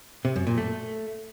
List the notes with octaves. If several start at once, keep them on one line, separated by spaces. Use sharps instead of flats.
C3
F#2
A#2
A3